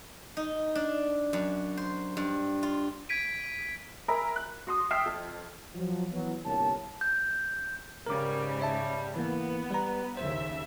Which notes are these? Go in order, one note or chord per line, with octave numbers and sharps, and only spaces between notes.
D#4
D4
F#2
C5
G2
F4
G#6 B6 D7 D#7
A#4 E5 G#5 A#5 B5
F#6
F#4 C6 D#6
E5 G5 D#6 F6 C7 E7
F2
F3 F#3
E3 F#3 B3
G1 C2 G2 A#3 C#5 A5
G6
G#2 C#3 G3 A#4 D6
C#5 E5 A5
E3 A#3 B3
G3 B4 A#5
A#1 D#2 C#3 C5 E5